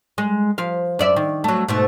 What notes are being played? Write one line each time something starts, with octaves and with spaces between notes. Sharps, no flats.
G#3
F3 F5
F#2 D5 E5
D#3
F#3 A3
G#2 B2 A3